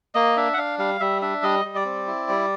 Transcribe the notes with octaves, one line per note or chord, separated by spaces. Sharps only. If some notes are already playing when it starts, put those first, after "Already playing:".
A#3 D#5
D4 E5
F#5
D4 F5
G3 F5
G3 E5
D4 E5
G3 D#5
G3
D5
C4
E4
G3